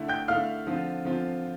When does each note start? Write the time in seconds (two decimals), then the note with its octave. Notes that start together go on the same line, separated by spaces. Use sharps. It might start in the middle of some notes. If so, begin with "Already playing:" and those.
Already playing: D3 A3 E4
0.08 G5 G6
0.28 D3 A3 E4 F5 F6
0.67 D3 F3 C4 F4
1.05 D3 F3 C4 F4